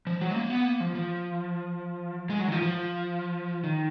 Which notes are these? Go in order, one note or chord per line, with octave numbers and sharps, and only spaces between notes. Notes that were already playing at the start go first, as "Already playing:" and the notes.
F3
F#3
G#3
A#3
B3
A#3
F3
F3
G#3
F#3
D#3
F3
F3
D#3